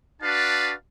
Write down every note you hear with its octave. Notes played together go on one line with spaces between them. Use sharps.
D4 F#4 B4 D5 F5 A5